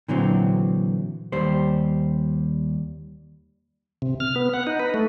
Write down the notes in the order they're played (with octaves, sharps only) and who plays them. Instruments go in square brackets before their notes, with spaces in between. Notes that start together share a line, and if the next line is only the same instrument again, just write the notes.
[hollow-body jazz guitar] A#2 D3 E3 F#3 C4
D#2 G3 C5
[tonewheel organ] C3
F6
B3
F#5
D#4
B4
A3